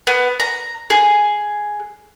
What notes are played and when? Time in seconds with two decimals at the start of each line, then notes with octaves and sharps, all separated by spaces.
0.07 B3
0.40 A#5
0.90 G#4